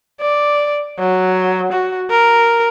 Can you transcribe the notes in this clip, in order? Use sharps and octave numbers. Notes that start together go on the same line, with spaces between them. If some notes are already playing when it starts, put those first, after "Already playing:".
D5
F#3
F#4
A#4